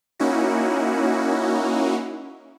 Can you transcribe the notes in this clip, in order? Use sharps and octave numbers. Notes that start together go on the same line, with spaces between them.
A#3 C#4 D#4 E4 F#4